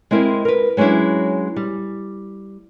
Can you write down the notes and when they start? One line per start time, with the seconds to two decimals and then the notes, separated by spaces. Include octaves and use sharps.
0.11 G#3 C4 E4 A#4
0.45 A#4 B4
0.77 F#3 G#3 C#4 D4 E4
1.56 G3